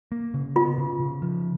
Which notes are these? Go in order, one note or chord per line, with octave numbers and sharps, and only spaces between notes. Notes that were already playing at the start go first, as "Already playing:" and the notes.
A#3
C#3
B3 F4
C#3
C#3
F3